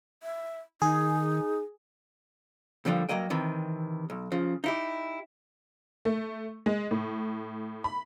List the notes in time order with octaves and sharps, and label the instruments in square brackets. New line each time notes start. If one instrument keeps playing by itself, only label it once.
[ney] E5
[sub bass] D#3 [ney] D#4 [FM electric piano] G#4
[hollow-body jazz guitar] F2 A#2 D3 F3 G3
G2 E3 F#3 A#3 D#5 G5
C3 D#3 E3
B1
C#3 F3
D#4 E4 G4
[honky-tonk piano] A3
G#3
A2
B5